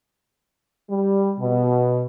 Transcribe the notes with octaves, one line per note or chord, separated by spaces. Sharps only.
G3
B2